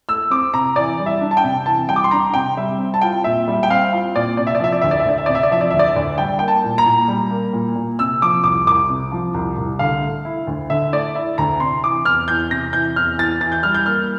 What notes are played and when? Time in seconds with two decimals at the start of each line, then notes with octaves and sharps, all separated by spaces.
0.09 A3 E6
0.30 C4 D6
0.53 C3 A#5
0.76 E3 D5
0.99 G3
1.06 E5
1.21 D4
1.31 A5
1.37 G5
1.44 C3
1.66 E3 A5
1.89 G3 G5
1.96 D6
2.04 C6
2.11 D4 A#5
2.34 C3 G5
2.57 G3 E5
2.79 C4
2.94 A5
3.02 F4 G5
3.24 A#2 E5
3.48 G3 E5
3.63 G5
3.70 C4 F5
3.92 F4 F5
4.15 A#2 D5
4.37 C3 D5
4.47 E5
4.55 D5
4.60 F3 E5
4.72 D5
4.81 D2 E5
4.91 D5
5.00 E5
5.05 D2 D5
5.18 E5
5.26 C3 D5
5.35 E5
5.43 D5
5.51 F3 E5
5.61 D5
5.70 D2 E5
5.79 D5
5.88 E5
5.96 D2 D5
6.18 G3 G5
6.39 A#3 G5
6.48 A5
6.64 A#2
6.78 A#5
6.86 A#2
7.08 G3
7.31 A#3
7.53 A#2
7.76 A#2
7.99 C3 E6
8.22 F3 D6
8.44 C2 D6
8.67 C2 D6
8.90 C3
9.12 F3
9.34 C2
9.58 C2
9.79 D3 F5
10.02 A3
10.25 E4
10.47 D2
10.70 D3 E5
10.93 A3 D5
11.15 E4 E5
11.38 D2 A#5
11.60 C3 C6
11.83 E3 D6
12.05 E2 F6
12.28 E2 G6
12.51 C3 A#6
12.73 E3 G6
12.96 E2 F6
13.18 E2 A6
13.41 E3 A6
13.52 G6
13.63 G3 F6
13.75 G6
13.86 A#3 F6